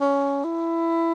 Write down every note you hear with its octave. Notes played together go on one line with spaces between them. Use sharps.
C#4
E4